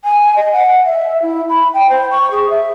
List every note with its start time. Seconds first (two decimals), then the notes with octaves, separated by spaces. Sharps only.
0.04 G#5
0.35 D#5
0.52 F#5
0.85 E5
1.22 E4
1.48 B5
1.73 G5
1.89 C5
2.10 C#6
2.31 G#4
2.49 E5